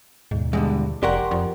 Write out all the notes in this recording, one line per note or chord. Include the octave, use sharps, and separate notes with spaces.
D#2 G#2 B2
E2 G2 D3 G#3
F1 G4 A#4 D5 F#5 C6 C#6
F2